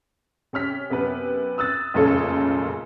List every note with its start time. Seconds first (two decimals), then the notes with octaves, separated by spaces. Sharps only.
0.53 C3 C#4 F6 B6
0.90 F#2 C3 B3 B4
1.58 D#6 E6 F#6 A6
1.94 F1 F#2 A#2 C#3 A4 C#5